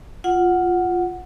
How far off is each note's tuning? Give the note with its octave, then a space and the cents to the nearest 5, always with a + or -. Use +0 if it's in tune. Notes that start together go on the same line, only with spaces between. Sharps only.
F4 +0 F#5 +0